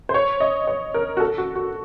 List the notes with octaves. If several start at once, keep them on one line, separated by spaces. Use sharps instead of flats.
C5
C#5
D#5
C#5
A#4
F#4
A4
F#4
F#4